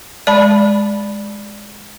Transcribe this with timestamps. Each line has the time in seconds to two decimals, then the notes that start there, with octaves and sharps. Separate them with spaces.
0.27 G#3 D5 A5 B5